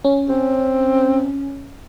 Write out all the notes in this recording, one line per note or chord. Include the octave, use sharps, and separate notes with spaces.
C#4
C4